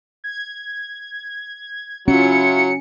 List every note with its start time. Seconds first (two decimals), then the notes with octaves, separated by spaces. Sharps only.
0.24 G#6
2.08 F#3 C#4 E4 F4 C#7